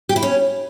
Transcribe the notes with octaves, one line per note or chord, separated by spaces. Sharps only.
G4
E4
C#4